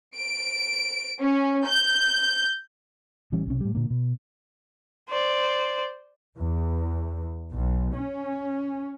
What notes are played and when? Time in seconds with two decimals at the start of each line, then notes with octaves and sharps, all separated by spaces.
0.17 D7
1.22 C#4
1.64 G6
3.32 A1 E3 G3 C#4
3.46 B1 C3 C#4
3.61 A2 G3
3.75 A#2 D3 A#3
3.90 B2
5.09 C5 D5
6.38 E2
7.52 B1
7.93 C#4